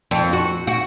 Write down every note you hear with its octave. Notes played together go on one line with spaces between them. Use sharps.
F2
F#4
F#4